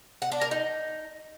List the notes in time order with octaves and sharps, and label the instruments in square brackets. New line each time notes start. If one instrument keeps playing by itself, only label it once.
[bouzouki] F#5
D4
A#4
D#4